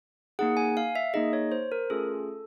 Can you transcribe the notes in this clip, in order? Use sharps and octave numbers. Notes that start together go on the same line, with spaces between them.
A#3 D#4 G#4 F#5
G#5
F5
E5
A#3 D#4 G#4 D#5
C#5
C5
A#4
A3 C#4 F4 G#4 A4